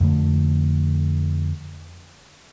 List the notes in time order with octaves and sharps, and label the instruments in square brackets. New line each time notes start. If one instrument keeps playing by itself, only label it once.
[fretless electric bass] F2 D3 A3